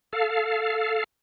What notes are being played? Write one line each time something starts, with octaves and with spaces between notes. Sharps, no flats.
A4 F5